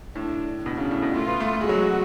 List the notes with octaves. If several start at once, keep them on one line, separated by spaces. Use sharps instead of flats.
A2 D4
B2 D4
C#3
A2
B2
A3 F4
B3
A3
A3
G#3
F#3 F#4
G#3